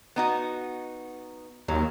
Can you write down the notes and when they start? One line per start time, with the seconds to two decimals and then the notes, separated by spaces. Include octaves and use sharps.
0.16 B3 D#4 F#4
1.68 D#2 F#3